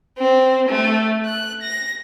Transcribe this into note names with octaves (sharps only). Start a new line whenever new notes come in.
C4
A3
F#6
A#6